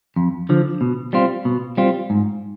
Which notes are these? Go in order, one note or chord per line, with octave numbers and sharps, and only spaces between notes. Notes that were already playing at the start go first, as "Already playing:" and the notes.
F2
D3 F3
B2
G3 C4 F4
B2
G3 C4 F4
G#2